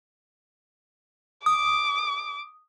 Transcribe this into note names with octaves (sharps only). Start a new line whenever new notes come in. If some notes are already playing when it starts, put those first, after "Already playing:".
D6 D#6